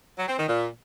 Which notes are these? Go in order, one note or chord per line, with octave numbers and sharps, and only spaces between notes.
F#3
C4
D#3
A#2